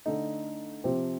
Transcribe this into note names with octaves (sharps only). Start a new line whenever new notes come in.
D3 A3 D#4
C3 F3 C4 G4 C5